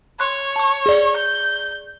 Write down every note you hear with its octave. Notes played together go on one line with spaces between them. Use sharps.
C#5 C6 F#6
A5 C#6
G#4 D5
G6